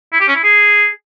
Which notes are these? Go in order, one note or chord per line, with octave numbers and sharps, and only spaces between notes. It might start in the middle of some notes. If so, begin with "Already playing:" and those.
E4
G4
C#4
E4
G#4